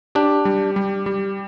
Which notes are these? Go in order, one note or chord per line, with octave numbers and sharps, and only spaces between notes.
D4 G4
G3
G3
G3